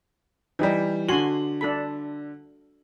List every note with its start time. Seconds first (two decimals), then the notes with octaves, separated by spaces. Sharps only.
0.59 E3 G3 D#4 G4
1.09 D3 F#4 G#5 C6 F#7
1.61 D4 A4 B5